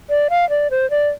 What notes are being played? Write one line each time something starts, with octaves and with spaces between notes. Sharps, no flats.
D5
F5
D5
C5
D5